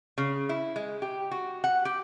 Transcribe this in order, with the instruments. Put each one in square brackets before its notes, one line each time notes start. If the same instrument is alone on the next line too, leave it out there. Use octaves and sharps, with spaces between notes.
[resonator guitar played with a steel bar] C#3
E4
G#3
G4
F#4
F#5
G4